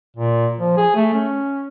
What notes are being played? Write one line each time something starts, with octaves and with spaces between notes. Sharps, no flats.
A#2
F3
G#4
A3
C#4